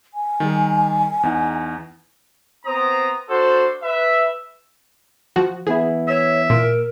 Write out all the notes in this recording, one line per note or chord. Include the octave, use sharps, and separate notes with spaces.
G#5
D#3 G3 G#4
E2 D#4 F#5
B3 C4 A#5 D#6
D4 F#4 A4 C5
B4 E5
F3 F#4
E3 B3 E4 G#4
C#5 E5
A#2 A#4